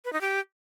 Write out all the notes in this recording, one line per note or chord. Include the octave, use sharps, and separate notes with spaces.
B4
D#4
G4